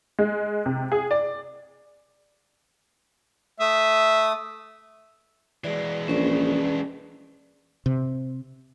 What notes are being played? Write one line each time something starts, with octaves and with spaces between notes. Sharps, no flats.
G#3
C3
G#4
D5
A3 E5 D#6
E3 G#3 D5
A#1 C#4 B4 D5
C3